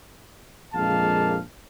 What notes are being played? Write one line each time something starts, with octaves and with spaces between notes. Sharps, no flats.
A#1 F2 G#3 A#3 F5 A5